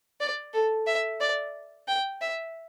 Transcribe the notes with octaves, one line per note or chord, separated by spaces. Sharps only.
D5
A4
E5
D5
G5
E5